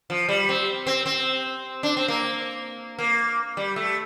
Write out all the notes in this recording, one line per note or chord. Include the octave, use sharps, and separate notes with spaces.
F3
G3
C4
C4
C4
D4
C4
A#3
A#3
G3
A3